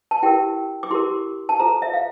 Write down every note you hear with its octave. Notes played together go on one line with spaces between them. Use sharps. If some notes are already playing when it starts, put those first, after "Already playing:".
A5
E4 G4 A#4 G5
D6
E4 G4 A#4 C6
A5
F4 A4 C5 A#5
E5
F5